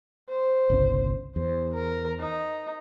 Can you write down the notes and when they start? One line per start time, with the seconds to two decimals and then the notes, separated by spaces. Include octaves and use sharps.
0.29 C5
0.70 G1 C2 C#3
1.36 E2 C5
1.74 A#4
2.20 D#4